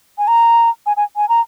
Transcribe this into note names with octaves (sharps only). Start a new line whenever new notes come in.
G#5
A#5
G#5
G#5
G#5
A#5